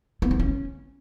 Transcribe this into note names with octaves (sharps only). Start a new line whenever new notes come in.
B3
C4
C#4